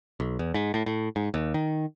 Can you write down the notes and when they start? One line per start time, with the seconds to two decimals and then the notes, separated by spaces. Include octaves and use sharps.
0.20 B1
0.39 E2
0.54 G#2
0.74 A2
0.86 A2
1.16 G#2
1.34 D#2
1.54 D#3